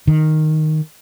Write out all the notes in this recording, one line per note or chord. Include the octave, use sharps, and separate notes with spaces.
D#3